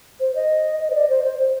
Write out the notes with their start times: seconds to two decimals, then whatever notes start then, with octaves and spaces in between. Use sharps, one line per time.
0.20 C5
0.35 D#5
0.80 D#5
0.90 C5
0.95 D5
1.09 C5
1.24 C5
1.39 C5